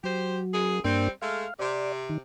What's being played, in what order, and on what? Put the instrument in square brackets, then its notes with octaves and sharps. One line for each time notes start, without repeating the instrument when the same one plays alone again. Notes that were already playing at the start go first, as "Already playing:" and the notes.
[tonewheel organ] F#3 [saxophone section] G4 C5
[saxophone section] F#2 G#4
[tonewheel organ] G2 A#3 D4 [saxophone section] G3 C4
[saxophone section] G#3 A3 [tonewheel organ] F5
[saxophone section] C3 [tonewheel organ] D5
[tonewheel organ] D#3